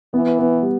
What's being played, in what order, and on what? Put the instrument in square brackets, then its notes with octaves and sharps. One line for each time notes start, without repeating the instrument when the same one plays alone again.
[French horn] E3 [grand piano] B3
[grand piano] B3
G3